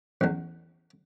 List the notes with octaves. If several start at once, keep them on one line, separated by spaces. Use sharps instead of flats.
A1 E2